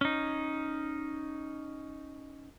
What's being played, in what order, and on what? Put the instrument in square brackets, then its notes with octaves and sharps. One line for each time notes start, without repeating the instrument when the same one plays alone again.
[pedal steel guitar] C#4 D#4